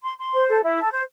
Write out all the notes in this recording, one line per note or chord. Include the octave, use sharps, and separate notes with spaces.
C6
C6
C5
A4
E4
A4
C5